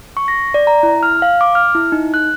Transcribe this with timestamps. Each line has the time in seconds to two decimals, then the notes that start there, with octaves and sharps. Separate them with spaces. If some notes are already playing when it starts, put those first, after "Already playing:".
0.17 C#6
0.28 A#6
0.54 D5
0.67 A#5
0.83 E4
1.03 F6
1.22 F5
1.41 D6
1.55 F6
1.75 E4
1.92 D#4
2.14 F#6